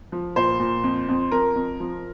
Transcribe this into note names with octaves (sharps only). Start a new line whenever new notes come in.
F3
A#2 C5
A#2
F2
F2
F2 A#4
F2
F3